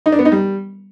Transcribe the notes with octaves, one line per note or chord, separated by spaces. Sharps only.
D#4
D4
B3
D#4
G3